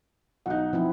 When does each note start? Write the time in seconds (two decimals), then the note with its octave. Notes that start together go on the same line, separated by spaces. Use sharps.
0.46 B1 D#4 F#5
0.73 F3 C4 E4